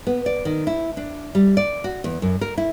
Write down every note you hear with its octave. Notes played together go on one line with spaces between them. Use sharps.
B3
D5
D#3
E4
D4
G3
D5
F#4
E2
F#2
A#4
E4